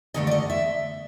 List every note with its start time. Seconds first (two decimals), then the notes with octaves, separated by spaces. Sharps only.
0.14 G2 D3 F3 A3 D#5
0.27 D5
0.31 D#5
0.50 E5